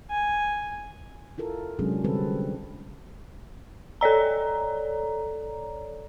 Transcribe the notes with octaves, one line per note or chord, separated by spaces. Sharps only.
G#5
E4 F4 A4 A#4
C3 F#3 G#3 C#4 D4 G#4
D3 G3 C4 A4 B4
A4 C#5 D5 A#5